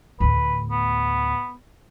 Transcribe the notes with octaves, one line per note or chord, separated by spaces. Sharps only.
D2 A2 B4
B3